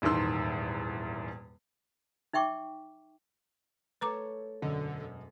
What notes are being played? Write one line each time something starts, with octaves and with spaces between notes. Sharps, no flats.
D#1 E2 G#2 D#3 C6 E6
D#4 E5 G5 C#6 D6
A3 A4 B4 C#5 A#5 D6
E1 F#2 D3 D#5